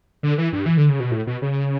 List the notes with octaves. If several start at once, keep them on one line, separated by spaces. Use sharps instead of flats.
D3
E3
G2
E3
D3
C#3
B2
A2
B2
C#3